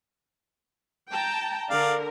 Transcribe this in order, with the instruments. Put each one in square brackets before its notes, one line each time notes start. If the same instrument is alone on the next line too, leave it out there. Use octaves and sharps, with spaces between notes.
[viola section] G5 A5 A#5
[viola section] D3 A#4 [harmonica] D5 F5